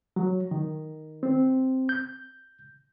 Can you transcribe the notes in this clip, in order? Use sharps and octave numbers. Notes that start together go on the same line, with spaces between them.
F#3
D#3
C4
G6